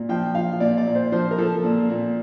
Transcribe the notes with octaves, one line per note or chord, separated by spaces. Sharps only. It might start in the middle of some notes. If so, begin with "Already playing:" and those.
Already playing: A#2
F3 G5
F3 F5
A#2 D5
D5
A#2
C5
F3 C5
A#4
F3 A4
A#2
A#2